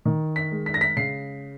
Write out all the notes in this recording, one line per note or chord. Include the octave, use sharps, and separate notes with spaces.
D#3
B6
G#3
B6
A#6
B6
C#3 C7